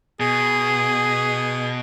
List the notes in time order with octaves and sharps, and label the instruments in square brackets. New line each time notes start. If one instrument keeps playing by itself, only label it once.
[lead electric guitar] B2 [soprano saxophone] G#4